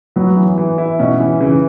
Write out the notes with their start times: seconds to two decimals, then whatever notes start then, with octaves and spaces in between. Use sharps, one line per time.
0.16 F#3 B3
0.37 E3
0.58 E3
0.78 E4
0.99 B2 C#4
1.20 E3
1.41 C#3 E3